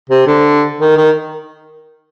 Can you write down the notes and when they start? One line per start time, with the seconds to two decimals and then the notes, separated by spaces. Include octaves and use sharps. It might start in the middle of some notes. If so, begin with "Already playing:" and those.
0.10 C3
0.27 D3
0.80 D#3
0.97 D#3